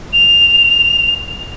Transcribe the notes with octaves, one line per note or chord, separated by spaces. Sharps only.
F7